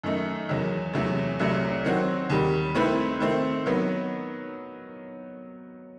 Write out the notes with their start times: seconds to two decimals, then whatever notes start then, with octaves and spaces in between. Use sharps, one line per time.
0.04 F#2 D#3 A3 D#4
0.49 E2 D#3 F#3
0.93 E2 C3 F#3 A3
1.39 C2 C3 F#3 A3
1.85 D#3 F#3 C4 F#4
2.30 D#2 D#3 G3
2.75 D#3 A3 C4 E4 B4
3.20 D#3 A3 C4
3.66 D#3 F#3 B3